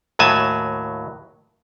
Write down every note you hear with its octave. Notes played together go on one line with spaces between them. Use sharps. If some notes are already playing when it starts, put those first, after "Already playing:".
D#2 A2 F#3 G#5 A5